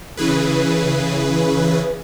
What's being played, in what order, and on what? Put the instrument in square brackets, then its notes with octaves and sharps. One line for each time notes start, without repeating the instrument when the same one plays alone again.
[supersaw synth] C#3 E3 G#4 B4